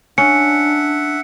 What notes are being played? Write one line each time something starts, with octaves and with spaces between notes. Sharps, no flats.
C#4 D4 E5 F#5 C#7